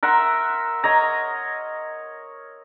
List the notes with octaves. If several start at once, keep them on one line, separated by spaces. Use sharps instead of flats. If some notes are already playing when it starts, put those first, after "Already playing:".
A#4 E5 F#5 C6
C#5 D#5 A#5